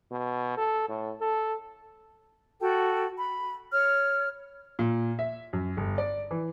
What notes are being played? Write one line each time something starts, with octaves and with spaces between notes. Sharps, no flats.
B2
A4
A2
A4
F#4 A4 G5 A5
B5
C#5 F6
A#2
E5
F#2
G1
D5
E3